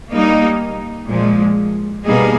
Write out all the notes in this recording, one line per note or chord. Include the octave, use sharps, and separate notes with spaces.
G3 A#3 D#4
A#2 F3 G#3
B2 G3 A#3 D#4 G#4